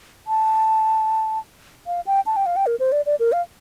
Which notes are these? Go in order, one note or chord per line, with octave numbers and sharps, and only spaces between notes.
A5
F5
G5
A5
G5
F5
G5
A#4
C5
D5
D5
A#4
F5